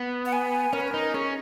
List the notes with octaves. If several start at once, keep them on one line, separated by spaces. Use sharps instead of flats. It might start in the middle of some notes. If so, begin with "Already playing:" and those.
Already playing: B3
F#5
G#5
C#4 A#4
B4
A#4
D#4
C#4 G#4